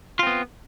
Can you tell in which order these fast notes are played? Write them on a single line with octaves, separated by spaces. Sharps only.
F4 C4 B3